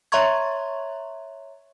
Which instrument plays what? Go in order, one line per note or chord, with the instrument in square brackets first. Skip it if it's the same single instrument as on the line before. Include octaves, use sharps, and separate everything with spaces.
[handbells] C#5 E5 A#5 C6 C#6 G#6